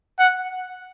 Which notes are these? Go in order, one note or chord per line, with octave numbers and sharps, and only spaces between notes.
F#5